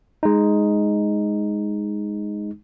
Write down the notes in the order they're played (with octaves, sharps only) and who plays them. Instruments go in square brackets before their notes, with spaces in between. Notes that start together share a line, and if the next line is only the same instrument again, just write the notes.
[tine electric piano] G#3 D#4